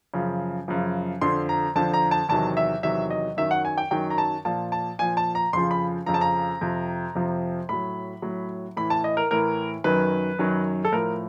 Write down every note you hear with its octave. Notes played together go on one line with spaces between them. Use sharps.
F#2 C#3 F3
F#2 C#3 F3
F2 D3 F3 C6
A#5
F2 D3 F3 A5
A#5
A5
E2 C3 D#3 F#3 A5
E5
E2 C3 D#3 F#3 E5
D#5
F#2 D#3 F#3 E5
F#5
G#5
G5
F#2 D#3 F#3 G5
A#5
A5
A#2 F3 A5
A5
A#2 F3 G#5
A5
A#5
F2 C#3 F3 C6
B5
F2 C#3 F3 A#5
A5
A#5
F2 C3 F3
F2 C3 F3
A2 F#3 B5
A2 F#3
A2 E3 B5
A5
D#5
A#4
A2 E3 A#4
F#2 D#3 F#3 B4
F#2 D#3 F#3
A4
A2 F3 A#4